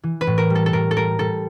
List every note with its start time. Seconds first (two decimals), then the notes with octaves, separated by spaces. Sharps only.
0.03 E3
0.21 B4
0.27 A2
0.38 A#4
0.50 G3
0.55 A4
0.66 A4
0.73 A2 A#4
0.91 A4
0.96 G3 A#4
1.19 G3 A4